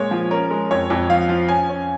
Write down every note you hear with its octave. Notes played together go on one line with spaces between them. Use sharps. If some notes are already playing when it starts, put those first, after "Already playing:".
Already playing: A#2 G#3 C#5
F3
C#4 A#4
G#3
F2 C#5
F2
F3 F5
F3
C#4 G#5
C#4